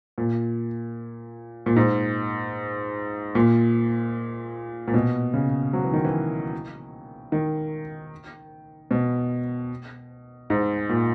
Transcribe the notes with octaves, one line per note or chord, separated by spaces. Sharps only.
A#2
A#2
G#2
A#2
A#2
B2
C#3
F#3
E3
D#3
E3
D#3
B2
G#2
A#2